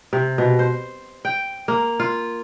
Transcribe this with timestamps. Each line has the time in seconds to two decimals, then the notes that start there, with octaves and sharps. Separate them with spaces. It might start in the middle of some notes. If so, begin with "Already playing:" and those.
0.13 C3
0.38 B2
0.59 C5
1.25 G5
1.68 A#3
2.00 F4